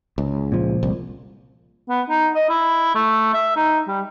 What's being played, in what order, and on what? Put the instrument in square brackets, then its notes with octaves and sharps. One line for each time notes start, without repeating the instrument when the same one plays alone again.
[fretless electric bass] C#2
[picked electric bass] A#2 F3
[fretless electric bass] C2
[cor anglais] B3
D#4
D#5
E4
A3
E5
D#4
G3